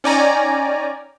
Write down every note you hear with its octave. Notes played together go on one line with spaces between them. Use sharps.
C#4 D#4 D5 G5 G#5 A#5